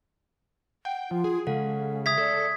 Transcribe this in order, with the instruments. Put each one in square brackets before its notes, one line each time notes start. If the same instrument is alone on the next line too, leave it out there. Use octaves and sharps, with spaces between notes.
[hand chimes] F#5 [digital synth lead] G5
[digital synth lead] F3 [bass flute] F4
[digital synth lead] G#4
[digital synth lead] C#3 [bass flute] G#3 [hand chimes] A4 F5 F#5
[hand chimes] E5 [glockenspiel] D#6 G#6 B6
[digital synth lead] A4 [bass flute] D5